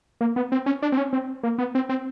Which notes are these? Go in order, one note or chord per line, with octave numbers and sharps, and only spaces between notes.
A#3
B3
C4
C#4
D4
C4
C#4
C4
A#3
B3
C4
C4